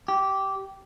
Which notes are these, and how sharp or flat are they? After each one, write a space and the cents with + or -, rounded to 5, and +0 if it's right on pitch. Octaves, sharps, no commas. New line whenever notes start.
G4 -15